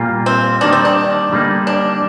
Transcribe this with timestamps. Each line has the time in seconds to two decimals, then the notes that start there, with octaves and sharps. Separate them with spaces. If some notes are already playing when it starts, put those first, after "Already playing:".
Already playing: A#2 G3 A#3 F4
0.26 C4
0.61 D#3 G3 A#3 D4 D#4
0.73 C4
0.85 D4
1.31 D3 G3 A#3 D#4
1.67 D4